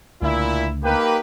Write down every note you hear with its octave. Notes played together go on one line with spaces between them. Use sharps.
C#2 A#2 D3 A3 E4
A#3 D#4 G4 A#4 B4